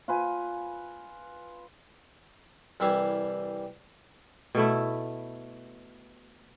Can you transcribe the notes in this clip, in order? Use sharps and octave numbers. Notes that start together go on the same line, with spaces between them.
F4 B4 G#5
C2 E3 G3 E5 F5 G#5
B2 A3 E4